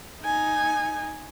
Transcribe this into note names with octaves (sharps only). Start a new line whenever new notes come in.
D#4 G#5